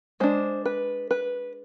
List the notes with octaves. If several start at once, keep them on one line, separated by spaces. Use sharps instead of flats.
G#3 D4 C5
B4
B4